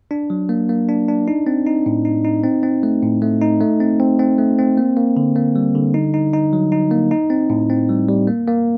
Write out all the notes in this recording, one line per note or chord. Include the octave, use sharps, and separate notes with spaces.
D4
F#3
A#3
A#3
D4
D4
D#4
C4
D#4
A2
D#4
D#4
C4
C4
A3
A2
A3
D#4
A3
C4
C4
C4
A3
C4
A#3
A#3
D3
A#3
G3
D3
D#4
D#4
D#4
F#3
D#4
A#3
D#4
C4
A2
C4
G3
G3
A#3
A#3